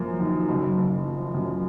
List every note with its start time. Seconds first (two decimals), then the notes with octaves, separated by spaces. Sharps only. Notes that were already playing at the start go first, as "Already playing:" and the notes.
Already playing: F#2 F3 A#3
0.20 D#3
0.48 F#1 F#3
0.77 F#1
1.05 F3
1.34 F#2